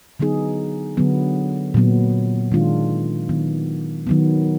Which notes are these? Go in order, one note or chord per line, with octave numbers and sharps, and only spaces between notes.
D3 F#3 B3 D#4 G#4
D3 F#3 B3
A#2 F#3 B3
D#3 G#3 D4 F4
D#3 F#3 B3
D#3 F#3 B3